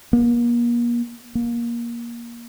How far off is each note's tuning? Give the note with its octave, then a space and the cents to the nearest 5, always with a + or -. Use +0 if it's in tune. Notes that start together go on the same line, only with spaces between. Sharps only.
A#3 +40
A#3 +20